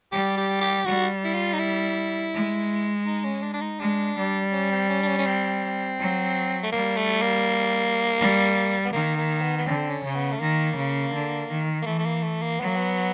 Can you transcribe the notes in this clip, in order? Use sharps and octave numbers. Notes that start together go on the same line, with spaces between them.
G3 G4
G4
G4
G3 F#4
E4
F4
D#4
E4
G#3
D#4
C#4
D4
D4
D#4
G#3 D4
G3
C#4
C4
C#4
D4
C#4
C#4
C4
F#3
A3
G3 A#3
A3
A#3
G3
B3
D#3 A#3
A#3
B3
B3
D3 C4
C#4
C#3
B3
A3
D#3 A#3
C#3
D3
D#3
A#3
E3 A3
A3
A#3
A3
A#3
F#3 B3
A#3
B3